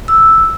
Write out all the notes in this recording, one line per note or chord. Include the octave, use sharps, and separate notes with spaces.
E6